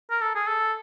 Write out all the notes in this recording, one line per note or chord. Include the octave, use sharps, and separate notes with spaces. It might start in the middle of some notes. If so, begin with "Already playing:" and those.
A#4
A4
G#4
A4